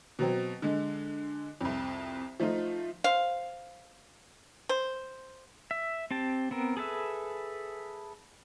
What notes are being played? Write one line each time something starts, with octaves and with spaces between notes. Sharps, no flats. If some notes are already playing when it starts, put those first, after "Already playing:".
B2 F#3 C4
D3 G#3
C2 F2
F3 A3 D#4 F4
C5 F5
C5
E5
C4 G4 A5
B3 C4 A#4
G#4 A4 B4 E5